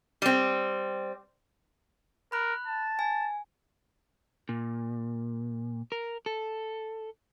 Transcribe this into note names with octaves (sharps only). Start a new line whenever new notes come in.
G3 C4
A#4 B5 F#6
A5
G#5
A#2
A#4
A4